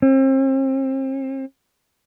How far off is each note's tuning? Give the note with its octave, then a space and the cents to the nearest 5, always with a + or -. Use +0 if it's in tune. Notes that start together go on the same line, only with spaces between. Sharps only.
C4 +40